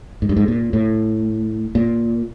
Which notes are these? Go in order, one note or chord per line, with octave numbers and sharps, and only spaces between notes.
G#2
G2
G#2
A#2
A2
A#2